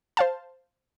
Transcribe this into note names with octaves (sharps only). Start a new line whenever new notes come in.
C5 F5 A5